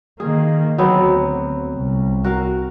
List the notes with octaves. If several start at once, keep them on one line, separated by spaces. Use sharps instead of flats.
D#3 A#3 G#4
D2 F#3 B3 C4
C2
F#4 A#4 F5